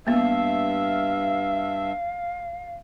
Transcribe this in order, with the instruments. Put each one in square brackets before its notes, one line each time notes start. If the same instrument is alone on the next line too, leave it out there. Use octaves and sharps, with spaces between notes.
[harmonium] G2 E5 [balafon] A#3 B3 [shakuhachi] F5